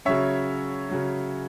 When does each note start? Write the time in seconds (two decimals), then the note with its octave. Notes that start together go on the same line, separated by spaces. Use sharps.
0.05 C#3 F#3 C#4 C#5 E5
0.89 C#3 F#3 C#4